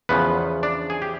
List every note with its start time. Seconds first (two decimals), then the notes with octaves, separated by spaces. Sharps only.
0.09 E2 C#3 F3 B3 B4
0.63 D4 D5
0.90 G#4
1.02 G4